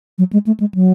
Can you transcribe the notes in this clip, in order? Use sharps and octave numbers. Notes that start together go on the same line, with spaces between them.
F#3
G#3
A3
G#3
F#3